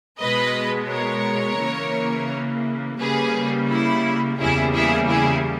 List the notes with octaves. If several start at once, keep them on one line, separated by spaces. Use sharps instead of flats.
B2 G#3 B3 B4 D#5
A#4 C#5
C#3 E3 A#3
C#3 G3 A#3 G#4 B4
E4
E2 C#3 G3 A#3 E4 G#4
E4 G#4
E4 G#4